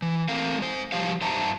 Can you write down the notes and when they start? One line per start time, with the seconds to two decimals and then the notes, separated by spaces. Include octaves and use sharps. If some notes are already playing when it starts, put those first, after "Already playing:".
0.02 E3
0.28 A3 C4 A#4 F5
0.58 G#3 C5
0.92 F3 G3 G4 C#5 F5
1.21 G2 C5 E5 A5 A#5